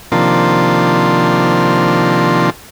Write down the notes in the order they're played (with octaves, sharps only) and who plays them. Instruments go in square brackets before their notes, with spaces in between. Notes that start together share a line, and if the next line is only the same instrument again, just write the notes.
[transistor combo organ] C3 D#3 F3 A#3 D4 F4